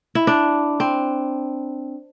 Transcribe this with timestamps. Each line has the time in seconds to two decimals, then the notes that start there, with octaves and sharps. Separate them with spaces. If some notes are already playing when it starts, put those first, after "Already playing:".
0.15 E4
0.27 D4
0.80 C4